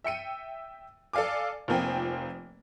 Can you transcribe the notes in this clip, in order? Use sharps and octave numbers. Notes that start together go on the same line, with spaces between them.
E5 G5 C#7 D#7
A4 D5 F5 G#5 D6
F1 F3 A#3 C4 G5 G#5